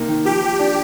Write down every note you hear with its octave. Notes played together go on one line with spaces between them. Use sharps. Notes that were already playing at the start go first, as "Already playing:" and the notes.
Already playing: C3 A#3 D#4
D#3
F3 G4
F3
D4